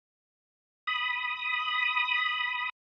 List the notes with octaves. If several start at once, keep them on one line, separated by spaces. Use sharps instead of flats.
B5 D#6